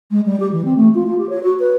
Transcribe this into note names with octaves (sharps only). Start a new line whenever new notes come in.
G#3
G3
G4
E3
C4
A3
F4
F4
G4
C#5
F#4
B4